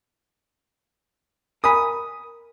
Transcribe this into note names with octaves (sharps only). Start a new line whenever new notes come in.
A#4 G#5 B5 D#6